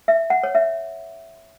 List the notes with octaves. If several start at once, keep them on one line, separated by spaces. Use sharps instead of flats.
E5
F#5
C#5
E5